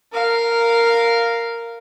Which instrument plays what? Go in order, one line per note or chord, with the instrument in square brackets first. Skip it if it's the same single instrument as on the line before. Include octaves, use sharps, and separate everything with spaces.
[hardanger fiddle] A#4 F5